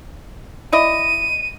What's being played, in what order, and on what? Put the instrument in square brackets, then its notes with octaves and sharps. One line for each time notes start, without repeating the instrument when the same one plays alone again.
[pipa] E4 D5 D#5 [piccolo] D#7